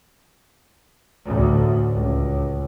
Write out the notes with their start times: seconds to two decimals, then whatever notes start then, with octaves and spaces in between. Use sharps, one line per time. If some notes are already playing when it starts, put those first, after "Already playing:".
1.26 D2 A2
1.91 C#2